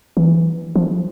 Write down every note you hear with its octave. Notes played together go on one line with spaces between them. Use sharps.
E3
F3